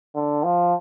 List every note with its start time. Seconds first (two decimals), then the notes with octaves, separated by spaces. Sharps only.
0.15 D3
0.44 F3